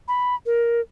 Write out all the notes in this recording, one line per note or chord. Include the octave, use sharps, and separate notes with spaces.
B5
A#4